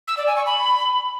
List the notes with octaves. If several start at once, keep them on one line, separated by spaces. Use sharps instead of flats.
E6
D5
G#5
C#6
B5